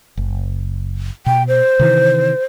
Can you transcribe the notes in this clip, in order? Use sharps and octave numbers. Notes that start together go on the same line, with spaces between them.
F#1
B2 G5
C5
C3 D#3 E3